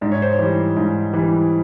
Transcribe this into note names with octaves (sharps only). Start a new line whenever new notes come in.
G#2 D5
C#5
C5
C#5
E3 G3
G#2
E3 G3